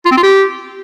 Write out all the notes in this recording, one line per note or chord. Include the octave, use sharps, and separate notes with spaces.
F4
C4
F4
G4